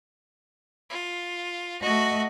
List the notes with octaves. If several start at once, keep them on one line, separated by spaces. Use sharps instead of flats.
F4
A3 F#4 D#5